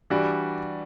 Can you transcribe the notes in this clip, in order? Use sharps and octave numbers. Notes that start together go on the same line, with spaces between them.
E3 G3 D4 F#4